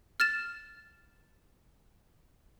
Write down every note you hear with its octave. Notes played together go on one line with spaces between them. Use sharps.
F6 A6 E7